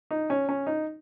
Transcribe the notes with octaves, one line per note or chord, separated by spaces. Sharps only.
D#4
C#4
C#4
D#4